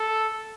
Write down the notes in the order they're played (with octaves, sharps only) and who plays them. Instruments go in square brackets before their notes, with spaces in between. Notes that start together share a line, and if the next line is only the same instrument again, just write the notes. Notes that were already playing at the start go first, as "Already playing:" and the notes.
Already playing: [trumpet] A4